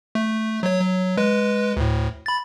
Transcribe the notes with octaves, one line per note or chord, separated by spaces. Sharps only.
A3
F#3 C#5
F#3
G#3 B4
D2 A2
B5 A6